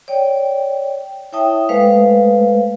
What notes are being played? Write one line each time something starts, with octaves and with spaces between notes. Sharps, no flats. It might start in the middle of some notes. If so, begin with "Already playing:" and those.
C#5 D5 G5
E4 C#5 E5 G5 A5 D#6
G#3 A3 A4 B4 C5 F5